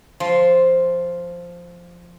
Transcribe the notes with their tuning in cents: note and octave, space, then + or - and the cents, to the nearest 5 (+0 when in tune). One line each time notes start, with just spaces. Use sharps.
F3 +0 C6 +0